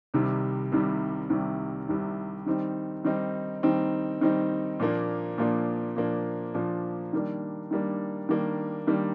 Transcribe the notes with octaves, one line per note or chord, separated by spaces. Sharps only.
C2 C3 D#3 G3
C2 C3 D#3 G3
C2 C3 D#3 G3
C2 C3 D#3 G3
D#3 G3 C4 D#4
D#3 G3 C4 D#4
D#3 G3 C4 D#4
D#3 G3 C4 D#4
A#2 F3 A#3 D4
A#2 F3 A#3 D4
A#2 F3 A#3 D4
A#2 F3 A#3 D4
D#3 G3 A#3 D4
D#3 G3 A#3 D4
D#3 G3 A#3 D4
D#3 G3 A#3 D4